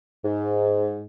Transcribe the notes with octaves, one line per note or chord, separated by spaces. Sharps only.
G#2